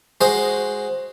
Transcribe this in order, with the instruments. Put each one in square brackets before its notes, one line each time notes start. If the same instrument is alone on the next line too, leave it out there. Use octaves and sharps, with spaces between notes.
[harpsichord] G#3 F#4 C5 D#5